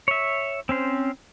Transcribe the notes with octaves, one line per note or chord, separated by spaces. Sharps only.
C#5 E5
C4 C#4 C5